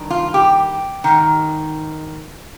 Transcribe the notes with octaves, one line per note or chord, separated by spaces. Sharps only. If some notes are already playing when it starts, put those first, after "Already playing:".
Already playing: G2 D#3
F4
G4
G#2 D#3